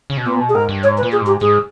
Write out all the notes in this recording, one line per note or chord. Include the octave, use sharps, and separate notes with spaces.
C#3
B2
A#2 B3
B2
G#4
G#2 A#4
G2
G#2 C#5
B4
A#2
G#4
G#2 G4
G#2 G#4